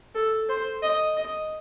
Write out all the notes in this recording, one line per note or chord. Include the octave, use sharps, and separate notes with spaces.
A4
C5
D#5
D#5